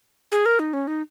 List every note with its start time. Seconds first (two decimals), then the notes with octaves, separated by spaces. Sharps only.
0.32 G#4
0.46 A#4
0.59 D#4
0.73 C#4
0.87 D#4